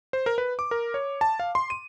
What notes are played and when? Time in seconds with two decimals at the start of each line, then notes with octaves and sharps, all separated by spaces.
0.13 C5
0.26 A#4
0.38 B4
0.59 D6
0.71 A#4
0.94 C#5
1.21 A5
1.40 F5
1.55 C6
1.70 D#7